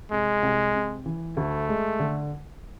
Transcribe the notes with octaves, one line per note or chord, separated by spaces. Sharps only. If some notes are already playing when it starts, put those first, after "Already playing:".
C2 G#3
C2
C3
E3
D2 A3
G#3
D3